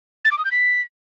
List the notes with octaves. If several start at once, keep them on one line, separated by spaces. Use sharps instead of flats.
A6
D6
D#6
G6
B6